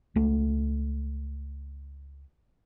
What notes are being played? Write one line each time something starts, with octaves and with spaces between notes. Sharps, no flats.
C#2 A3